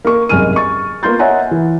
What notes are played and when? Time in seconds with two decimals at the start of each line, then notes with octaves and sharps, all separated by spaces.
0.05 A#3 A#4 C#6
0.29 F#1 C2 G#2 G#5 F6 D#7
0.56 C#6 A6
1.03 A#3 B3 F4 C6 G6 A6
1.19 C#5 D#5 E5 F#5 G#5 A#5
1.51 E3